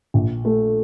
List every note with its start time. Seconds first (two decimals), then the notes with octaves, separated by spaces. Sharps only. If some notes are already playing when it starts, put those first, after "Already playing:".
0.14 A#1
0.45 A3